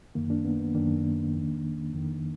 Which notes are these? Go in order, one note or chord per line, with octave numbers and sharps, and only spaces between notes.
F#2 D#3 A#3
A#3 D4
B3
B3
F#2 D#3 A#3 D4
F2 D#3
F2 D#3